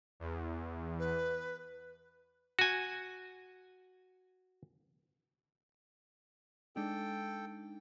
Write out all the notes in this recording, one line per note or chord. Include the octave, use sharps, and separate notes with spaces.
E2
B4
F#4 G#5
G#3 D4 D#4 A4 G5